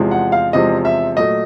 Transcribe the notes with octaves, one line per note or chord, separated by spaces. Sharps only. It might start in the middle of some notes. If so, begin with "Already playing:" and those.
Already playing: E2 C3 F3 G#3
F#5
F5
E2 C3 F3 G#3 D#5
E5
A#2 F#3 A3 D#5